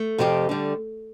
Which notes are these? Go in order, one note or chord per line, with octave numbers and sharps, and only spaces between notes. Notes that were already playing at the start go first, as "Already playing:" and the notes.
Already playing: A3
F2 C3 F3 C4 G4
D3 G3